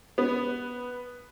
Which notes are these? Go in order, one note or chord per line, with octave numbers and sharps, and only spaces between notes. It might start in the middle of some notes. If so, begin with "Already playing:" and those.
B3